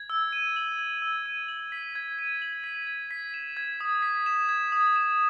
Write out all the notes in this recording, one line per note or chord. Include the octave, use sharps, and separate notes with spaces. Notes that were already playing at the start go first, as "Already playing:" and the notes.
Already playing: G#6
E6
D#7
F#7
G#6
E6
D#7
F#7
B6
G#6
D#7
F#7
B6
G#6
B6
E7
G#6
D#6
B6
E7
G#6
D#6
E7